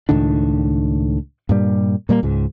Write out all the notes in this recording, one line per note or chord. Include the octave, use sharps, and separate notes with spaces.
C#2 A2 D#3 D4
G2 A#2 G3
A#2 G3 A#3
C#2 G#2